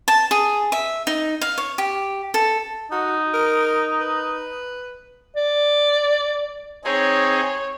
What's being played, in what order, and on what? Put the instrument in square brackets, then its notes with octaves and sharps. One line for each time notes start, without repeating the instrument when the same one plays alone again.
[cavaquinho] A5
G#4
E5
D#4
F5
C#5
G4
A4
[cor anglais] D#4 [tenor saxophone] F#4
[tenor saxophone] A#4
B4
[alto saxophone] D5
[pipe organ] C4 D#4 G#4 [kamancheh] C#5